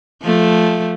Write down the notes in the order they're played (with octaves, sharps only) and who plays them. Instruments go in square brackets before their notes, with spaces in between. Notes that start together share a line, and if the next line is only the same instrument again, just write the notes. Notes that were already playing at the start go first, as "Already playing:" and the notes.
[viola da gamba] F3 A3